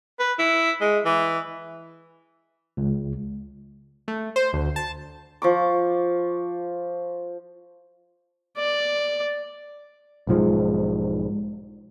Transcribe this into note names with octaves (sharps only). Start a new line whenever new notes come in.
B4
E4
G#3
E3
C#2
A3
C5
D2
A5
F3 C#6 D6
D5
B1 G#2 F3 G#3